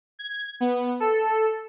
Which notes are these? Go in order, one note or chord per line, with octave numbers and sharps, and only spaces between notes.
G#6
B3
A4